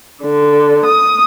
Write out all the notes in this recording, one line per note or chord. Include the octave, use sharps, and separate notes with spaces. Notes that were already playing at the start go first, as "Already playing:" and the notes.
D3
D#6